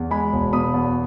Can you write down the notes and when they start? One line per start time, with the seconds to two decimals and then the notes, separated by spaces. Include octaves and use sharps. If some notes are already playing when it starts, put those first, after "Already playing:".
Already playing: E2
0.11 G#3 G#5 B5
0.32 E1
0.53 B2 B5 D#6
0.74 E2